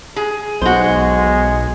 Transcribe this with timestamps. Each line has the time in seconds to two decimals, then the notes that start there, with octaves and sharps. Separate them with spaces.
0.16 G#4
0.61 B1 G#3 F#4 C5